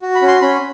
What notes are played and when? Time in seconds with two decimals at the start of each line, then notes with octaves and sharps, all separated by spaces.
0.02 F#4
0.15 B5
0.22 C#4
0.28 C6
0.41 C#4 B5